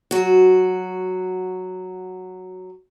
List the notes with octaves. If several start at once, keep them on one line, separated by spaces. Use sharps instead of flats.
F#3 F#4